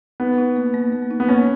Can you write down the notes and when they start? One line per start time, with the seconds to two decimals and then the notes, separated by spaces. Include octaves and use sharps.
0.20 B3 D#4
0.38 D#4
0.56 A#3
0.74 A#3
0.92 A#3
1.11 D#4
1.20 B3
1.28 A#3 C#4